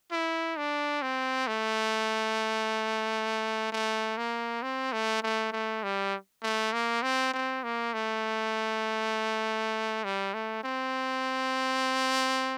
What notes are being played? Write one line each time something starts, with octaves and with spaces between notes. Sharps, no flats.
E4
D4
C4
A3
A3
A#3
C4
A3
A3
A3
G3
A3
A#3
C4
C4
A#3
A3
G3
A3
C4